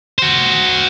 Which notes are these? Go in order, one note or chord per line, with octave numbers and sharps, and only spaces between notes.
F#4 C5